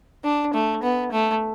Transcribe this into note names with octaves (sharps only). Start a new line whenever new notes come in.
D4
A3
B3
A3